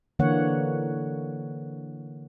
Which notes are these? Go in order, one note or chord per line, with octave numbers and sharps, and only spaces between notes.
D3 E3 A#3 C#5 F#5